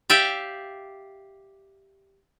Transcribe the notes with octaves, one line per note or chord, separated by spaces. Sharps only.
G4 D5 E5 F5 G5